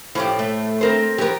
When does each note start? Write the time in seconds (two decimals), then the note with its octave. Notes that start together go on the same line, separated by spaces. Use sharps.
0.15 A2 F3 C#4 G4
0.39 A3
0.81 C4 A#4 C5
1.18 F3 F#3 G4 A#4